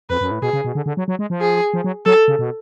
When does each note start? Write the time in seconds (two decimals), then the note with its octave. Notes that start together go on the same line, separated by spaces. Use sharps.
0.10 F2 B4
0.21 F#2
0.31 A2
0.42 B2 G#4
0.53 C#3
0.64 B2
0.75 D3
0.86 D3
0.97 F#3
1.08 F#3
1.19 G#3
1.30 F3
1.41 G#4
1.74 F3
1.84 F#3
2.06 F#3 A4
2.28 C#3
2.39 B2